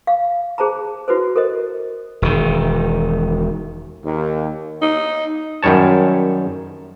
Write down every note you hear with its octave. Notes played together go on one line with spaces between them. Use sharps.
F5
G#4 C5 A5 A#5
E4 F#4 B4 C5
A4 A#4 C5 D#5
E1 D#3
D#2
D#4
F#2 D#3 G3 C#5 A5